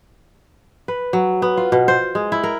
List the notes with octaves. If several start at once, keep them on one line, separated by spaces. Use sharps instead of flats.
B4
F#3
B3
F4
B2
C5
G#3
E4
A#4